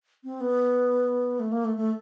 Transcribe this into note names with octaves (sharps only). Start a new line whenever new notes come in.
C4
B3
A3
A#3
A3
A3